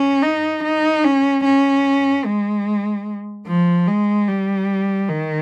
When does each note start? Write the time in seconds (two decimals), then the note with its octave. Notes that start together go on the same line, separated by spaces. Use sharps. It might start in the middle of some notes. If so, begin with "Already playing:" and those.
Already playing: C#4
0.23 D#4
0.64 D#4
1.04 C#4
1.45 C#4
2.26 G#3
3.47 F3
3.87 G#3
4.28 G3
5.09 D#3